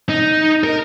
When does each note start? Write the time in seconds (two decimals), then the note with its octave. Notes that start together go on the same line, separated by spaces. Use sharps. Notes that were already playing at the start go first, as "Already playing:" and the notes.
0.09 D#4
0.64 A#4